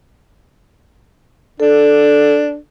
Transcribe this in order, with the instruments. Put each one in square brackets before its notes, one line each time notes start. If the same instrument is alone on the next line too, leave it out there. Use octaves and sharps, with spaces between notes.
[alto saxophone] D4 [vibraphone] A4